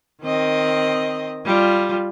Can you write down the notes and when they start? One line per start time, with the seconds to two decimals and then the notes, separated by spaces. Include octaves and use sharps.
0.22 D#3 C4 D#5
1.45 G3 F4